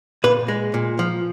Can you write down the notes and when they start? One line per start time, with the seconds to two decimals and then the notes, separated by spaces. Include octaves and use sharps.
0.24 A#2 B4
0.48 G#3
0.74 A#2
0.99 F3